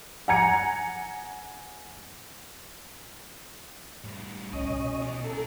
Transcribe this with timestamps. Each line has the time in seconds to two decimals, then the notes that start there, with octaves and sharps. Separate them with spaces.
0.28 F#5 G#5 A#5 G#6 C#7
4.04 A2 G3
4.53 C2 C#4 D#5
4.70 B2
5.01 B3 G#4
5.24 E4 A4 A#4